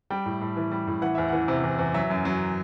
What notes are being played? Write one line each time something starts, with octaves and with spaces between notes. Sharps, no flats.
G3 G5
A2
A2
E3
G3
A2
E3 F#5
E2 E5
E3 F#5
C3
E2
E2
F#3 E5
F#2
F#3